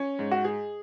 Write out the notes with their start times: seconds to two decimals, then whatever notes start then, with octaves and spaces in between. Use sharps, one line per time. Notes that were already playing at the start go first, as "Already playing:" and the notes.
Already playing: C#4
0.19 G#2
0.31 F#4
0.44 G#4